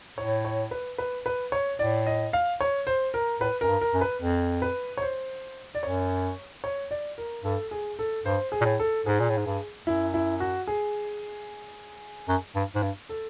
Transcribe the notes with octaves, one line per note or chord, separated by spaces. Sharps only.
A2 C#5
C#5
B4
B4
B4
C#5
A2 D5
D#5
F5
C#5
C5
A#4
A2 B4
F#2 A#4
G2
A#4
F#2
B4
F2
B4
C#5
C5
D5
F#2 C#5
C#5
D5
A#4
G2 A4
G#4
A4
G2 C5
G#4
A#2
A2
A4
G#2 G#4
A#2
A2
G#2
G2
F#2 E4
E4
F#4
G#4
F#2
G2
G#2
G2
A4